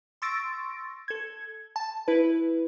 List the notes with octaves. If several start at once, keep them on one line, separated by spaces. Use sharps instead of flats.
C6 C#6 E6 A6 A#6 D7
A4 G#6
A5
E4 B4